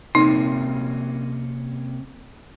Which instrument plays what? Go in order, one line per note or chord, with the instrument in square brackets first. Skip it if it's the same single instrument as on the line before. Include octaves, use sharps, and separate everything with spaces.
[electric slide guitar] C3 A#3 C#4 [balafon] D#4